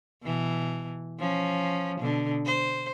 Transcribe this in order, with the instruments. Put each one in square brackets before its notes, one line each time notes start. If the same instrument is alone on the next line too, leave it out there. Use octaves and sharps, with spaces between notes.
[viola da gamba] B2 E3
F3 C#4
B2 D3
C5